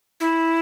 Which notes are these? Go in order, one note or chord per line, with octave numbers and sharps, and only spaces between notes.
E4